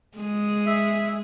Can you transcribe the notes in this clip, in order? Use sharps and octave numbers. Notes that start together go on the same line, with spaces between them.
G#3 G#4
E5